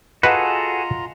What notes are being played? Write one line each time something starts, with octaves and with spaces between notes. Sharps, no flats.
F4 F#4 G#4 A4 B4 D#5 F#5 A#5